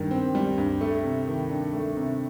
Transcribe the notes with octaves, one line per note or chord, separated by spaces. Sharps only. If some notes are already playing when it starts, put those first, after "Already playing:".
Already playing: G2 D#3 G3
C4
G3
G2
A3
C3
D#3
D4
A3
C3